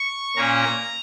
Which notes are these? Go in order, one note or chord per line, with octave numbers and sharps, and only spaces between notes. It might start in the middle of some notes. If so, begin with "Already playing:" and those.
Already playing: C#6
A#2 A#3 C#4 A#5